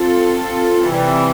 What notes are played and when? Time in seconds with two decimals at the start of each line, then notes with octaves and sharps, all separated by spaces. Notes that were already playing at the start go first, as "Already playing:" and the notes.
Already playing: C4 F4 A4
0.89 C3 E3 G3